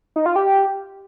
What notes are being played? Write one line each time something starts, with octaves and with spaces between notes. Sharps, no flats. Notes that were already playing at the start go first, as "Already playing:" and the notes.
D#4
F4
G4